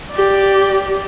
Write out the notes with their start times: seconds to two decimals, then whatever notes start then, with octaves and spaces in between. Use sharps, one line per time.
0.12 G4 D5